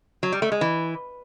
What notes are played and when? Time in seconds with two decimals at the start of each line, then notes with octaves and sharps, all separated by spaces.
0.23 F#3
0.32 G3
0.42 A3
0.52 G#3
0.61 E3